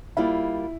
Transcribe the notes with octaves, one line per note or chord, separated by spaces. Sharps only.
G3 A#3 E4 F4